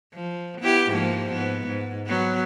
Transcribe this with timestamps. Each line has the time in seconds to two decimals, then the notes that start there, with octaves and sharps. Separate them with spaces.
0.14 F3
0.61 B3 E4 G4
0.90 G#2 F3 A#3
1.32 G#2 B3
1.67 G#2
2.07 F#3 B3